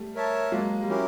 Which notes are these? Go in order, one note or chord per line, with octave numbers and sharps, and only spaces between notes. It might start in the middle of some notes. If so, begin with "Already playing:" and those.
Already playing: G3 A3
A#4 C#5 E5 A5
F#3 G#3 A#3
G3
F#3 C#4 E4 G4 A#4